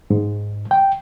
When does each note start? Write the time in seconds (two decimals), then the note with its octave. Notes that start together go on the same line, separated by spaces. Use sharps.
0.10 G#2
0.71 G5